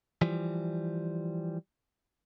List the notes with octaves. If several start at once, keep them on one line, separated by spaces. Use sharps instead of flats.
E3 F3 G3